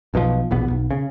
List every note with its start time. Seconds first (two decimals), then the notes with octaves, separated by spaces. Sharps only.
0.14 B1 B2 D3 F3
0.51 E1 A#1 B3
0.70 B1
0.91 C#3